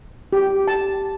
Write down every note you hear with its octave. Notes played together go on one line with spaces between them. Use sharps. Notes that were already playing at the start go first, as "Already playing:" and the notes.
G4
A5